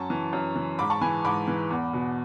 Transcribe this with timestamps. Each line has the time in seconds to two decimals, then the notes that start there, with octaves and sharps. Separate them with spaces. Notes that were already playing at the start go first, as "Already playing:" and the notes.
Already playing: F#2 A5 C#6
0.10 E3
0.33 F#2
0.56 E3
0.79 G#2 B5 D6
0.90 A5 C#6
1.01 E3 G#5 B5
1.25 G#2 B5 D6
1.48 E3
1.70 E2
1.93 B2